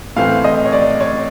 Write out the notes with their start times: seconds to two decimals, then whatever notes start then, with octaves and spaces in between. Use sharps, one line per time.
0.16 A2 E3 A3 C4 F5
0.44 D#5
0.66 C#5
0.72 D5
1.01 C#5